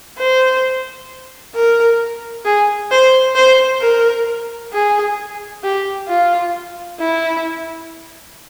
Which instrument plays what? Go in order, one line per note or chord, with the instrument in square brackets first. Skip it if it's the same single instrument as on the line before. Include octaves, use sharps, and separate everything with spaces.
[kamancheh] C5
A#4
G#4
C5
C5
A#4
G#4
G4
F4
E4